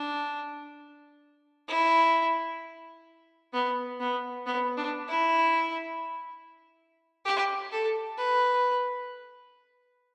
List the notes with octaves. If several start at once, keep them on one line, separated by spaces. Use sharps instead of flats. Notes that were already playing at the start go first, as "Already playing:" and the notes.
Already playing: D4
E4
B3
B3
B3
D4
E4
G4
A4
B4